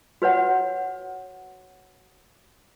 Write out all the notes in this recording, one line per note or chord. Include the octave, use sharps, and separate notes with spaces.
F#4 B4 C#5 F#5